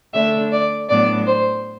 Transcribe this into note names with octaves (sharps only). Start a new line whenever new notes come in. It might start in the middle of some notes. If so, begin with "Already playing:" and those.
D3 A3 D4 E5
D5
A2 F#3 B3 D4 D5
C5